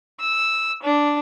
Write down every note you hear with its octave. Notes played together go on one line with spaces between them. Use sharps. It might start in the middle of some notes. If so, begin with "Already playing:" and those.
E6
D4